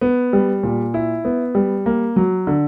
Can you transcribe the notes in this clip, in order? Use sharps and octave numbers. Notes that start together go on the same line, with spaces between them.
B3
G3
A#2
E4
B3
G3
A#3
F#3
D3